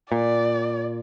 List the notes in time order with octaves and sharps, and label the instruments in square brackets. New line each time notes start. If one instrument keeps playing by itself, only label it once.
[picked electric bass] A#2 [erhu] D5